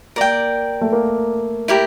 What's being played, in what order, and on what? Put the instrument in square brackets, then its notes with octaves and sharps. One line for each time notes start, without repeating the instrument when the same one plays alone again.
[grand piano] A#3 [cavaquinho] A#4 D5 G5
[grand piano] A3
A#3
[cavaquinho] E4 G4 A#4